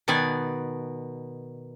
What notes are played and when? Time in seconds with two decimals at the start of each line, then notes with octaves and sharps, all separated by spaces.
0.08 B2 D#3 B3 D5 G#5